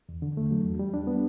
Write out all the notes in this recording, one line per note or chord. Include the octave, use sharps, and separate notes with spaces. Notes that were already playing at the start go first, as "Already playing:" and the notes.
E2
D3
A3
F#3
E2
G3
D4
B3